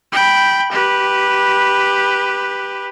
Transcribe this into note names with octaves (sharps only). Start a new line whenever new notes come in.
G5 B5
G4 B4